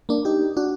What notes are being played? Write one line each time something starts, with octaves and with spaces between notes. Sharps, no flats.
A#3 D4
D#4 G4
D4 F#4